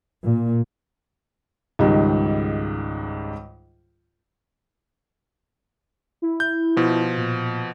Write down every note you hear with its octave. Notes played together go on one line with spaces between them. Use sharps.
A#2
C#2 G#2 D#3 G3
E4
G6
B2 F3
A#2